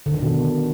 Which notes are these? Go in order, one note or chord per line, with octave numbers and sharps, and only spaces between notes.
D3
D#3
B2